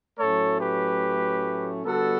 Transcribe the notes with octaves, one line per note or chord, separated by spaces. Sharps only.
A2 F#3 A3 C#4 A4 C#5
G4 B4
D3 G3 B3 F#4 A4